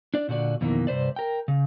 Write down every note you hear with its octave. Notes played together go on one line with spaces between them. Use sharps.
D4 D5
A#2 D3 F#4 D5
F2 B2 D#3 E3 A#3
G2 C3 B4 C5 D5
A#4 G5
C#3